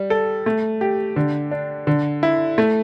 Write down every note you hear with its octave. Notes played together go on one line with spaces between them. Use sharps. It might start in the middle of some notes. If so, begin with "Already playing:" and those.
Already playing: G3
A4
A3
G4
D3
D4
D3
E4
A3